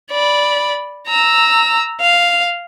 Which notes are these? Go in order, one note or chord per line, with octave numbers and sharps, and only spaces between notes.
D5 B5
A#5 E6
F5